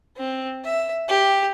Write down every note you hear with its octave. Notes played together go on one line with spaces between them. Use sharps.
C4
E5
G4